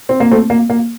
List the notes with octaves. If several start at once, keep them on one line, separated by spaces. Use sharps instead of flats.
C4
A#3
A3 C4
A#3
A#3